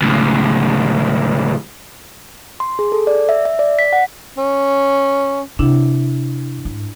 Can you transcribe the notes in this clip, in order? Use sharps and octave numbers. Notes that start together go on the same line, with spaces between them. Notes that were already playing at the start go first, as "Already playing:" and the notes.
C#2 A2
C6
G#4
A4
D5
E5
E5
D5
B6
F#5
C#4
C3 D4 E4
G#2